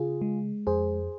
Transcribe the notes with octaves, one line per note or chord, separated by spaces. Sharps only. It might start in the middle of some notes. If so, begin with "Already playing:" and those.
Already playing: C#3 F4 G#4
G#3
F2 G#4 C5